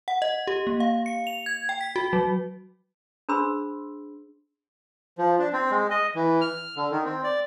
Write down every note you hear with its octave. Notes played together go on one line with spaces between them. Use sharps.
F#5
D#5
G4
A#3
F5
C#7
F7
G#6
G5
B6
F#4
F#3
D4 G#4 C5 B5 C6 E6
F3
D4
C4
G#3
D#5
E3
F6
D3
D#3
C4
D5